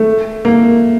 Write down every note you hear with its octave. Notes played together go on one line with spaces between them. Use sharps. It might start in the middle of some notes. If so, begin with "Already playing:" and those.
Already playing: A3
A#3